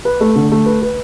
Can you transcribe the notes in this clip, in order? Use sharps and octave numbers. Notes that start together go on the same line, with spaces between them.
B4
A3
D3
A3
B4
B4